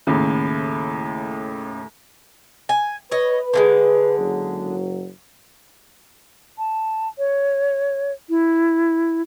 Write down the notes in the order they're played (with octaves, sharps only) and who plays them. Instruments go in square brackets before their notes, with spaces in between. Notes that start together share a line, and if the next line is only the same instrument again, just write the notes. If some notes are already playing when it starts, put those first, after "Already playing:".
[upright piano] D#2 A2 C#3
[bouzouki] G#5
[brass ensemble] B4 [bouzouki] C#5 D#5
[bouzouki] D3 E3 G#3
[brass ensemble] F#1 F#3
[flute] A5
C#5
E4